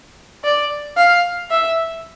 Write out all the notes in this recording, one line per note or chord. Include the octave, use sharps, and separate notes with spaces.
D5
F5
E5